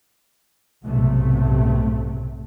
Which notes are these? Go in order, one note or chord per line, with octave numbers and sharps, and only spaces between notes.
B1 G#2 C3 A3